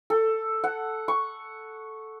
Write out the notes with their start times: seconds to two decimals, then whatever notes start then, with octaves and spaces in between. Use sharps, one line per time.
0.10 A4
0.64 F#5
1.08 C#6